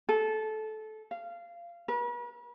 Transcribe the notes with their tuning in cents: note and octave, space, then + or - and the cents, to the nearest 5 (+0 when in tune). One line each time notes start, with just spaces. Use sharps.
A4 -20
F5 -20
B4 -45